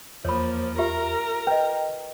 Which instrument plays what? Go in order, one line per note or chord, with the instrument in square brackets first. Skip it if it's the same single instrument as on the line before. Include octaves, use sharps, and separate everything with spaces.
[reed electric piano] E2 [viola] F3 A#3 [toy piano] C#5 B5
[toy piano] F4 G4 E5 [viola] A#4 A#5
[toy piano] B4 D#5 [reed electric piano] G5